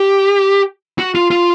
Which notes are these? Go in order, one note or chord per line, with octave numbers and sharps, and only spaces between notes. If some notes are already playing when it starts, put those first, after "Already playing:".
Already playing: G4
F#4
F4
F4